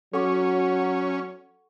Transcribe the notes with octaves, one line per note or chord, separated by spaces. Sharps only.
F#3 C#4 A4 F#5 C#6